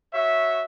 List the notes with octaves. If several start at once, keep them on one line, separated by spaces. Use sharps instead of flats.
F#4 C#5 E5